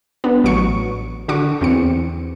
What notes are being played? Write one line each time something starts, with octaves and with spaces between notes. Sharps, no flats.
B3 D4
A1 F#3 C#6 C#7
D3 F#4 C#6 D6
E2 C4 C#7